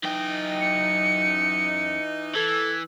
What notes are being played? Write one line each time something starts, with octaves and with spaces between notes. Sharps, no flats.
F#2 E3 D#4 G5
C#7
E3 A4 G#6